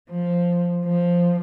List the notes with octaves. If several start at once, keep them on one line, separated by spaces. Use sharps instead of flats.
F3
F3